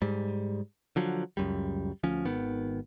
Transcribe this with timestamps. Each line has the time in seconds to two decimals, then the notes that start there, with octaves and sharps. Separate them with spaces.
0.02 G#2 G3
0.96 D3 F3 F#3
1.37 C#2 F#2 G3
2.03 D2 F3 C#4
2.25 G#1 D#3 B3